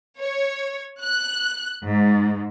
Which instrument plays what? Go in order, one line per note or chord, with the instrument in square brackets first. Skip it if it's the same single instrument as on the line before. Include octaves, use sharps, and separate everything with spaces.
[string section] C#5
F#6
G#2